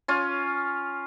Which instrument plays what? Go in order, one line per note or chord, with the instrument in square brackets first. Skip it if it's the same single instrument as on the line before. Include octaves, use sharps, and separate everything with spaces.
[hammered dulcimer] C#4 F4